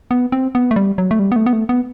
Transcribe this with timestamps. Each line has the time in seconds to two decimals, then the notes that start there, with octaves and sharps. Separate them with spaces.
0.11 B3
0.32 C4
0.55 B3
0.71 A3
0.76 G3
0.98 F#3
1.11 A3
1.19 G3
1.32 B3
1.36 A3
1.46 B3
1.53 A3
1.69 B3